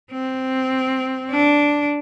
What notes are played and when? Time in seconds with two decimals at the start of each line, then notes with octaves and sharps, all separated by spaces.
0.11 C4
1.30 D4